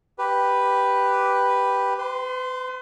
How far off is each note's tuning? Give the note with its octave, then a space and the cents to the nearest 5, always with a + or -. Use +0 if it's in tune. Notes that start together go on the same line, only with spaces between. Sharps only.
G4 +0 B4 +0
B4 +40 C6 -10